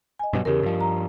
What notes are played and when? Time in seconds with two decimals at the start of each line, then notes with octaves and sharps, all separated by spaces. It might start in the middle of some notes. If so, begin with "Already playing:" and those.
0.19 D#5 G#5
0.33 G2 B2 F#3
0.45 E2 C#3 G4 A#4
0.63 G2 F3
0.81 A#5